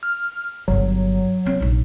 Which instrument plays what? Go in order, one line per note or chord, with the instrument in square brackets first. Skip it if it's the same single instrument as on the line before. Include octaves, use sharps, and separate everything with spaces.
[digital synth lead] F6
[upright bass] G1 D3 [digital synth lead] F#3
[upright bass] B3 C4
A#1 D#4